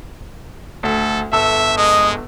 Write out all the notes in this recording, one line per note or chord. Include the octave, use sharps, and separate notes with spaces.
D2 A4
G1 A4 E5 E6
G#3 D#5